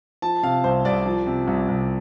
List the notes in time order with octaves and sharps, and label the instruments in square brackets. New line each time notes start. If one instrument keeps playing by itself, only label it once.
[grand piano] F3 A5
C3 F5
C2 C5
C2 D5
F3
C3
C2
C2